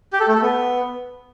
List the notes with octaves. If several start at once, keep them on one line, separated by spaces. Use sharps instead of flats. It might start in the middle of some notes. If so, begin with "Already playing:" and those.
G4
A4
A3
A4
B3